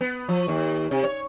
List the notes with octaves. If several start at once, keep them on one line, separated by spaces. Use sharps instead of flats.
B3
F3
D#2
C3
C#5